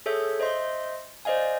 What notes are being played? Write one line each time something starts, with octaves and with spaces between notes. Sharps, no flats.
G#4 A4 C#5 E5 G6
C5 D#5 E5 C6
C5 D5 D#5 F5 G#5